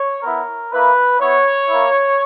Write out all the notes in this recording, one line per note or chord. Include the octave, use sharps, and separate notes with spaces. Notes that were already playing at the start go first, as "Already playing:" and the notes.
Already playing: C#5
B3 E4 A#4
A#3 E4 B4
B3 E4 C#5
A#3 E4